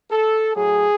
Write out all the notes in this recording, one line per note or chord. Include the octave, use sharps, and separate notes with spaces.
A4
A2 F#3 G#4